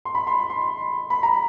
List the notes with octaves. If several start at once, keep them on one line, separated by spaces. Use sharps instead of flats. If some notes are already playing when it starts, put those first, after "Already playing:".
C6
B5
C6
C6
B5
A#5